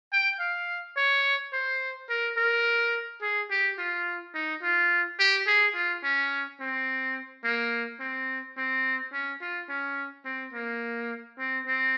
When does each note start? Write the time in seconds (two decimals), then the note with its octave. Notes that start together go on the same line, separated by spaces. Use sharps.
0.13 G5
0.40 F5
0.96 C#5
1.53 C5
2.10 A#4
2.37 A#4
3.22 G#4
3.51 G4
3.79 F4
4.35 D#4
4.62 F4
5.19 G4
5.47 G#4
5.75 F4
6.04 C#4
6.60 C4
7.44 A#3
8.00 C4
8.57 C4
9.13 C#4
9.41 F4
9.69 C#4
10.25 C4
10.53 A#3
11.39 C4
11.67 C4